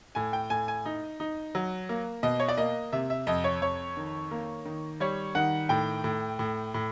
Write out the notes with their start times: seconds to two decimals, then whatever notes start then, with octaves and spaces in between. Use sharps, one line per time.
0.15 A2 G#5
0.33 G5
0.50 A2 G#5
0.68 G#5
0.85 D#4
1.20 D#4
1.55 F#3
1.89 A#3
2.23 B2 D#5
2.39 C#5
2.48 D5
2.57 A#3 D#5
2.92 C3 E5
3.10 E5
3.27 F2 D#5
3.44 C#5
3.61 F2 C#5
3.97 D#3
4.31 A#3
4.65 D#3
5.00 G3 C#5
5.35 D#3 F#5
5.69 A2 G5
6.04 A2
6.39 A2
6.74 A2